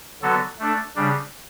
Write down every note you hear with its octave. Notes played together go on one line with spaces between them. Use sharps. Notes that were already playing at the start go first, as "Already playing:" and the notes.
D3 F#3 B3 F#4 A4
A3 D4 A4
C#3 G3 D4